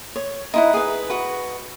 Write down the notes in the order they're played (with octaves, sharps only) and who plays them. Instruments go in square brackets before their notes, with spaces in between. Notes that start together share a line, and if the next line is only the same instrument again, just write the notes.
[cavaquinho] C#5
D#4 E4 F#5
G#4 B4
F#4 B4